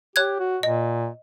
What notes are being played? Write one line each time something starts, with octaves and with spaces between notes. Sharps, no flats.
G4 C#5 F#6 G#6
F#4
A#2 D#5